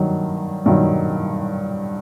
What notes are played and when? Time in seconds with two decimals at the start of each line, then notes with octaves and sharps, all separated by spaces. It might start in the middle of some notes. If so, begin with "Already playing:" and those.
Already playing: G2 D#3 F#3
0.66 G2 D#3 F#3